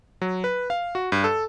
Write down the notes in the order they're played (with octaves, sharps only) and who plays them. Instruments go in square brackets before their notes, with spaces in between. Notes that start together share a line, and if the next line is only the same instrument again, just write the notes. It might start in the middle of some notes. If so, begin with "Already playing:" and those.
[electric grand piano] F#3
B4
F5
F#4
G2
A4